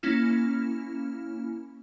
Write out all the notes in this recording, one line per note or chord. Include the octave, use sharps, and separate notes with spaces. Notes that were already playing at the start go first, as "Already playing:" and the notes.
A#3 C#4 E4 F6